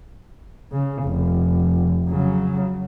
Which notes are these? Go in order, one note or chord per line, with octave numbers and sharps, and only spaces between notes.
C#3
F1
C#3 F#3